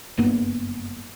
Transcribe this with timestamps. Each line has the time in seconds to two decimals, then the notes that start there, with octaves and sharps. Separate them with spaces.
0.18 F#1 G2 A#3 B3